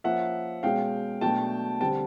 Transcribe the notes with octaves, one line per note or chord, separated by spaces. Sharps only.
F3 A#3 C#4 E5 F#5
B2 G#3 C#4 F5 G5
B2 F#3 A3 D4 G5 A5
D3 G3 C4 G5 A5